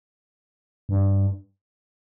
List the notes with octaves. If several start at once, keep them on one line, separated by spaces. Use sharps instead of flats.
G2